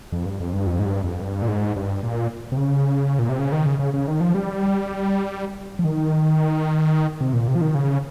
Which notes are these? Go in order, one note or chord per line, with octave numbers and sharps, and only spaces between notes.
F2
G2
F2
G2
F2
G#2
G2
F2
G2
A#2
G#2
G2
A#2
C3
C#3
A#2
C3
C#3
D#3
C#3
C#3
C#3
D#3
F3
G3
F3
D#3
C3
A#2
C3
F3
D#3
C#3